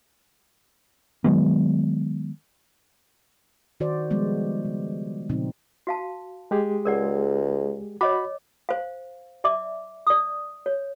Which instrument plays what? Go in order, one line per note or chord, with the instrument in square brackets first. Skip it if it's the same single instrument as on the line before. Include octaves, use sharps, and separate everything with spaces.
[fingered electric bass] D#3 F#3 G#3 B3
[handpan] D#3 F#4 C5 D5
F3 G3 G#3 B3
C#3
A#2 C#3 F3 C4 D#4
[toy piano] F#4 F5 A5
[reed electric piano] G#3 G4 G#4
[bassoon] C#2 [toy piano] A#4 D5 F#5
[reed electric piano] F#4 B5 [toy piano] C#5 D#5 D6
[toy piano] C5 F5
D5 E5 D6
D5 D#6
C#5